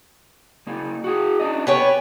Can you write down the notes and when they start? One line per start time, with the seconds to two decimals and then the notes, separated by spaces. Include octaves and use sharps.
0.67 C#3 A#3
1.04 F#4 G#4
1.39 C#4 D4 D#5
1.67 B3 G4 C#5 G#5